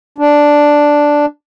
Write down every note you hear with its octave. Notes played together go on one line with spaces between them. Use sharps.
D4